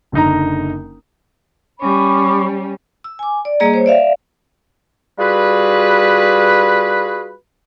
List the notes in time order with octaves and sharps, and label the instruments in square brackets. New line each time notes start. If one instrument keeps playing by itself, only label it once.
[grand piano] F#1 D3 D#4 A#5
[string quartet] G3 C#4 [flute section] B5 C#6 D6
[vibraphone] E6
G#5 D6
D5
G3 A#3 G#4 D#5 A#5
C5 C#5
D5 E5 F5
[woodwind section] G3 F4 F#4 G#4 B4